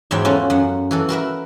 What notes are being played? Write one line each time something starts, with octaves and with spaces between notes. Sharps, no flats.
E2 G#2 F#3 E5 G5 B5
A3 C#4 F4 F#4
F#2 F#5
E3 F#4 A4
F#4 A#4 B4 E5